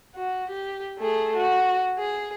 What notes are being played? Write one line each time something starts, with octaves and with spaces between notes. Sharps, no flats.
F#4
G4
A3 G#4
F#4
G#4